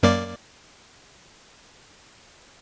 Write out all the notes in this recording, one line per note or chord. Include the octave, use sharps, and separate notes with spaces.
F#2 A#3 D5